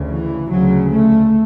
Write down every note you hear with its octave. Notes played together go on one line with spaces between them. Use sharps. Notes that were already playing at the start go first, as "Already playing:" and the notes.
Already playing: D2 C#3
E3
D2 C#3 F#3
A3